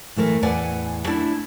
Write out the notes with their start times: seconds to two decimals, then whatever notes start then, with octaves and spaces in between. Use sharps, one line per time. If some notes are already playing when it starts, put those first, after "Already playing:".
0.16 A2 E3 A3 A#4
0.42 E2 A2 B4 D5 F#5 G#5
1.07 A3 D4 E4 D5